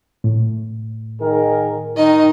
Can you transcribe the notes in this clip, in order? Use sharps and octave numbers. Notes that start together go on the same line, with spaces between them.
A2
D#3 G#4 A#4
D#3 D#4 D#5